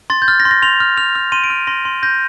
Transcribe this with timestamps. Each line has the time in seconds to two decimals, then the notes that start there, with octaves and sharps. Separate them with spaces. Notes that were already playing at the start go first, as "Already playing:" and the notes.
0.10 C6 A6
0.22 G6
0.28 F6 A6
0.40 A#6
0.45 C6
0.51 A#6
0.62 C6 F7
0.80 F6
0.97 F6 F7
1.15 F6
1.32 C6 D#7
1.44 D7
1.50 F6
1.67 C6 A#6
1.85 C6
2.03 G6 A#6